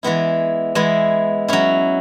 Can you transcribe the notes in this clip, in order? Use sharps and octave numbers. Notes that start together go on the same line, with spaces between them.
E3 G#3 B3 E4
E3 G#3 B3 E4
F#3 C#4 E4